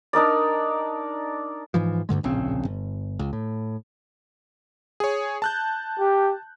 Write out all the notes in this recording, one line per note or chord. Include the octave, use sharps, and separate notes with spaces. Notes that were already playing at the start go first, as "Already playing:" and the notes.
D4 D#4 A#4 D5
G#2 E3 F3
D2 G2 D3 G#3
D1 A#1 C#3 C4
G1
C#2
A2
G#4 C#5
A5 F#6 G6
G4